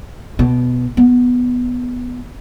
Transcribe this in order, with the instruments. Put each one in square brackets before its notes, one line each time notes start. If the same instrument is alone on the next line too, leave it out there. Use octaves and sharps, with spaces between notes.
[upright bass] B2
B3